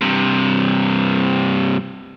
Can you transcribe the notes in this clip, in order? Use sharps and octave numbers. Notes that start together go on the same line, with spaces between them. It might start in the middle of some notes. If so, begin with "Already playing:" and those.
G2 C3